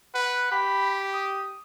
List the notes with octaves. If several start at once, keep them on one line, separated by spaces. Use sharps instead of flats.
B4 F#5
G4 B5
D#6